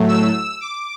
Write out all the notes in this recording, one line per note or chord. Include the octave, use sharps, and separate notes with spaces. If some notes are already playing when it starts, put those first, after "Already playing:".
Already playing: A2 F#3 A3
E6
D6